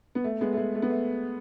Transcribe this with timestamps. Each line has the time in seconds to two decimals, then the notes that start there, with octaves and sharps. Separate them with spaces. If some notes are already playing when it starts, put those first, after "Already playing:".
0.15 B3
0.24 A3
0.41 G#3 B3
0.53 A3
0.57 G#3
0.75 A3
0.82 B3
0.90 A3